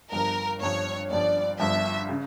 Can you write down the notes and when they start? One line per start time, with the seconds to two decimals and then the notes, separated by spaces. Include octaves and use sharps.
0.12 G1 G2 F3 A#4
0.60 G1 G2 F3 C#5
1.10 G1 G2 F3 D5
1.59 G1 G2 F3 E5
2.09 C#3